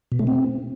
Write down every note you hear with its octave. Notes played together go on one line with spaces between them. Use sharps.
B2
A3
C4